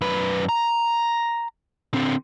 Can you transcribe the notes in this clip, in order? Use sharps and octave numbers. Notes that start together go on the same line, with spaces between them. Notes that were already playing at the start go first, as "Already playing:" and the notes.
F#2 B4
A#5
D3 C4